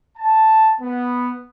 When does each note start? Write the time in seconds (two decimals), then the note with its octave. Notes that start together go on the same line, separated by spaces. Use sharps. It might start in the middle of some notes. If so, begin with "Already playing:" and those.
0.18 A5
0.80 B3